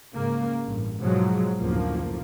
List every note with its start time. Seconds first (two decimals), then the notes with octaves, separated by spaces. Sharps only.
0.14 G#2 C#3 A#3
0.63 A1 G2
0.99 G#2 B2 F3 F#3 G#3
1.60 F#1 D2 A2 F3 A#3